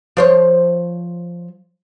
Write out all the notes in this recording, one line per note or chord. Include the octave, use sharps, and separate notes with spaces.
F3 C5 C#5